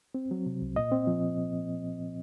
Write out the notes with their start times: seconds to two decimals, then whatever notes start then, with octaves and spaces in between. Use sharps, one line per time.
0.15 C4
0.31 F#3
0.46 C3
0.62 C2
0.76 A#2 D#5
0.92 C4
1.07 F3